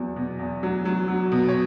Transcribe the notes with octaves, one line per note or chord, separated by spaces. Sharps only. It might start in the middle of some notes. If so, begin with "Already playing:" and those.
Already playing: E2 F#3
B2
E2
F#3
F#3
F#3
B2
C#5